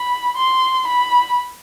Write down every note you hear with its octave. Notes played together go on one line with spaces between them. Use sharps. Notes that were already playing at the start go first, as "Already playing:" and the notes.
Already playing: B5
C6
B5